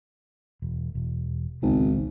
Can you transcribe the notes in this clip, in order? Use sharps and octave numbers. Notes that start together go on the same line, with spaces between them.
E1
E1
D#1 G#1 C#2 B3